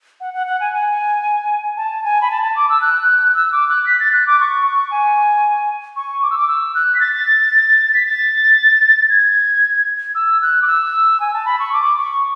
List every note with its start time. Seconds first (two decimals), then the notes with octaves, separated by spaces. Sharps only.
0.20 F#5
0.34 F#5
0.47 F#5
0.60 G#5
0.73 G#5
1.77 A5
2.04 G#5
2.21 B5
2.30 A5
2.43 A5
2.56 D6
2.69 E6
2.82 F#6
3.35 E6
3.52 D6
3.69 F#6
3.86 B6
4.00 A6
4.13 F#6
4.27 D6
4.40 C#6
4.66 C#6
4.91 G#5
5.96 C#6
6.22 D6
6.31 E6
6.38 D6
6.48 E6
6.75 F#6
6.95 B6
7.00 A6
7.94 B6
8.06 A6
9.10 G#6
10.15 E6
10.42 F#6
10.62 D6
10.67 E6
11.20 G#5
11.33 A5
11.46 B5
11.59 C#6
11.73 D6
11.98 C#6